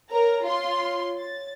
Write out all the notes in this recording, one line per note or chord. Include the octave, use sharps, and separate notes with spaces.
A#4 C#5 A#5
F4 C6
A6